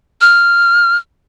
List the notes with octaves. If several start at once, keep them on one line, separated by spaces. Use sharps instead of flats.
F6